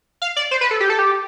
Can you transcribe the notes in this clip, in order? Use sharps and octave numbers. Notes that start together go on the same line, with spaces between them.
F5
D5
C5
B4
A4
G4
A4
G4